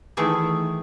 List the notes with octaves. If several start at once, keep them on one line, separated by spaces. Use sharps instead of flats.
D#3 E3 A3 G#4